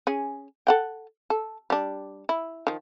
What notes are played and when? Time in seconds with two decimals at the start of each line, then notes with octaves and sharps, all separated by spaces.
0.07 C#4 G#4
0.67 A4 F#5 G5
1.30 A4
1.70 G3 D4
2.29 E4
2.67 D#3 F3